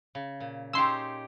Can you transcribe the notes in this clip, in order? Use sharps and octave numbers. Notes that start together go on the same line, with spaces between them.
C#3
A#2
C#4 D#4 G4 C6 E6